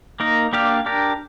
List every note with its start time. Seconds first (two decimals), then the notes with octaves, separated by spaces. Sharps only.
0.20 A#3 D#4 A#4
0.53 A#3 D4 G4 D5 F5
0.86 D4 G4 A#4